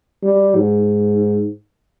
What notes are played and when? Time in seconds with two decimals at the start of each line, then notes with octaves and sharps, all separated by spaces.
0.24 G3
0.56 G#2